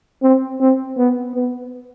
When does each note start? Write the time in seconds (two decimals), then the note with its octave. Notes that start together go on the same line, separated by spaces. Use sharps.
0.22 C4
0.60 C4
0.97 B3
1.35 B3